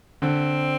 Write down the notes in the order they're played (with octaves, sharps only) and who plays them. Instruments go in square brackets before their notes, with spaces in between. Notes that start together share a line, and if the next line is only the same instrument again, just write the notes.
[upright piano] D3 [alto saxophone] C4